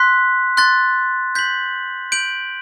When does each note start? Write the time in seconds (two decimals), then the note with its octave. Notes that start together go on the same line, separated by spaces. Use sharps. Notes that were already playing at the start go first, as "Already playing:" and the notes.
Already playing: C6 F#6 B6
0.57 C6 F#6 A6
1.35 G6 B6 F#7
2.12 G6 D7 F#7